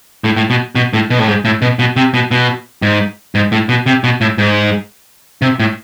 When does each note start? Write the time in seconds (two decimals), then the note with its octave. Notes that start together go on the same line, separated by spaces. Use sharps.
0.24 A2
0.36 A2
0.50 B2
0.75 B2
0.93 A2
1.10 B2
1.19 A2
1.28 G#2
1.45 A2
1.62 B2
1.79 B2
1.96 C3
2.14 B2
2.31 B2
2.82 G#2
3.35 G#2
3.52 A2
3.69 B2
3.86 C3
4.04 B2
4.21 A2
4.38 G#2
5.42 C3
5.60 A2